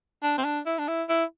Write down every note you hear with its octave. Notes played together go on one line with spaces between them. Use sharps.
D4
C4
D4
E4
D4
E4
E4